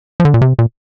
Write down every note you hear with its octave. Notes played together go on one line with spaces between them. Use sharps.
F3
D3
A#2
C3
A#2